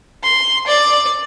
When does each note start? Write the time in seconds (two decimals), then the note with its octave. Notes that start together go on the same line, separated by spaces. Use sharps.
0.23 C6
0.67 D5